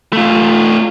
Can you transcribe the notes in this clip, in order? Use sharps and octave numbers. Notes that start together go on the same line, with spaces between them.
A3 F4